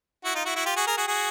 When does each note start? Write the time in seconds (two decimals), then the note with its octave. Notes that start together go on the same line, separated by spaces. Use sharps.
0.25 E4 F#4
0.35 D#4 F4
0.45 E4 F#4
0.56 E4 F#4
0.66 F4 G4
0.76 F#4 G#4
0.87 G#4 A#4
0.97 F#4 G#4
1.07 F#4 G#4